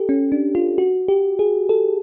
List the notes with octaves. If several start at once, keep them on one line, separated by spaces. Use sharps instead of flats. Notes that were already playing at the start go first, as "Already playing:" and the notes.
Already playing: G4 A4
C#4
D4
F4
F#4
G4
G#4
A4